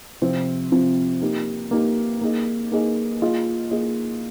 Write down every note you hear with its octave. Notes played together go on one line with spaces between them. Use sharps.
C3 F3 C4 F4
C3 F3 C4 F4
A#3 D#4 G4
A#3 D#4 G4
A#3 D#4 G#4 D#5
A#3 D#4 G#4 D#5
A#3 F4 G#4 D#5
A#3 F4 G#4 D#5